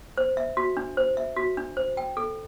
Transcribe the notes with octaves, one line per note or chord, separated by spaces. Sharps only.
C5
E5
F#4
D4
C5
E5
F#4
D4
C5
G5
A4